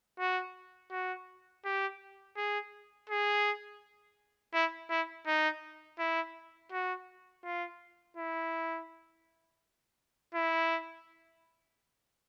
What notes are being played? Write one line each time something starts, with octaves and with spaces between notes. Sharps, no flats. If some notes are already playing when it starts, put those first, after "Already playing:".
F#4
F#4
G4
G#4
G#4
E4
E4
D#4
E4
F#4
F4
E4
E4